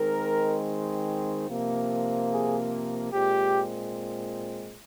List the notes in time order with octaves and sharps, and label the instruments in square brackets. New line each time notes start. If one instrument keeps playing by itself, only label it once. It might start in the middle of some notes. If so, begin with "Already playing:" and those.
Already playing: [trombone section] D#3 G#3 C4 A#4
C3 F3 A#3
G#4
A#2 G#3 C4 G4